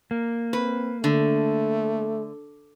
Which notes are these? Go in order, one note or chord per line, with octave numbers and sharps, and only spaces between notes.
A#3
C4 B4
D3 A3